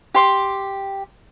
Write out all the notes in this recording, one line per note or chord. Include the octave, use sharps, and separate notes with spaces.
G4 C6 D6